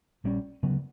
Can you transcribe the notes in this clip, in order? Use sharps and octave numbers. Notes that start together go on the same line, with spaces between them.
A#1 A#2 G3 C#4
D2 C#3 F#3 B3